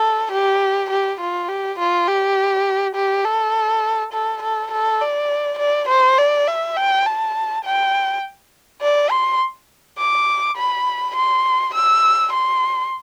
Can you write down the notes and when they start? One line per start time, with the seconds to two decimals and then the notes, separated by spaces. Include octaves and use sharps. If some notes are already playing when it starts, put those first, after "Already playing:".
Already playing: A4
0.32 G4
0.90 G4
1.20 F4
1.49 G4
1.79 F4
2.08 G4
2.95 G4
3.25 A4
4.13 A4
4.43 A4
4.72 A4
5.01 D5
5.59 D5
5.89 C5
6.18 D5
6.47 E5
6.77 G5
7.06 A5
7.64 G5
8.82 D5
9.11 C6
9.98 D6
10.57 B5
11.16 C6
11.74 E6
12.33 C6